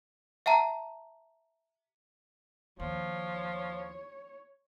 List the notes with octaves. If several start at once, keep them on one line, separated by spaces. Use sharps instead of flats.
E5 F#5 A5 A#5
D#2 F3 C#5